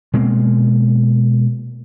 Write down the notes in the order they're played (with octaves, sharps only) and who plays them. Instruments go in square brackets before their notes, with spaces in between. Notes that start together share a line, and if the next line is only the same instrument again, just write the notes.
[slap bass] B2 G#3 A#3 C4